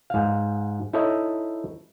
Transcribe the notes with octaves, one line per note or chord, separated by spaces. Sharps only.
G#2 F5
D#4 E4 A4 C#5 D#5